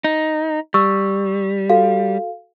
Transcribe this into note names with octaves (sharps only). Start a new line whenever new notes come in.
D#4
G3 C#6 E6
F#4 A4 F5